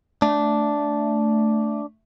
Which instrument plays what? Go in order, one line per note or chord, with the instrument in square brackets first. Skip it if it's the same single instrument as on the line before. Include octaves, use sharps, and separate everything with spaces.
[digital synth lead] A3 [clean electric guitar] D4